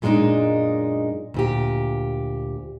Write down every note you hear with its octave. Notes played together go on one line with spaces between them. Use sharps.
F#2 A#2 G#3 A3 D4 D#4
D2 A#2 G4